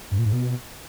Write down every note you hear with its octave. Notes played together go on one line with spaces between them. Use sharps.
G2
A#2
G#2
B2